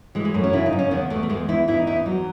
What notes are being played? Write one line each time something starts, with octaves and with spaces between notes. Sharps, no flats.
E3 G#3
G#3
F#2 A3
C#4
C#3 E4
D#4
F#2
C#4
E2 B3
E2 A3
A3
E2 G#3
E2 E4
E2 E4
D#4
E2 E4
D#4
E2 F#3